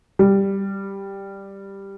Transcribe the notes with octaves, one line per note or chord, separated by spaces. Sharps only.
G3